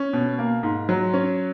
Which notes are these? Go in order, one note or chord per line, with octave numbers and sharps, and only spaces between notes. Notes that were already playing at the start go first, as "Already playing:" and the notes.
Already playing: C#4
B2
A#3
G#2
F#3
C#4